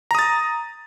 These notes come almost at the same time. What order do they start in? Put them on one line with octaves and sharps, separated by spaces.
A#5 D#6 A6